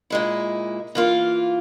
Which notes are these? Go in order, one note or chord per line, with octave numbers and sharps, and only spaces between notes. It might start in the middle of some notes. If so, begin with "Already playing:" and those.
A#2 G#3 E4
E3 A#3 F4